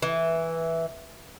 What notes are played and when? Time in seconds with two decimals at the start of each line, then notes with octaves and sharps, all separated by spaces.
0.02 E3